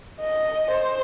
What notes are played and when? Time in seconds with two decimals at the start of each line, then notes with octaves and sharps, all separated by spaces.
0.20 D#5
0.70 C5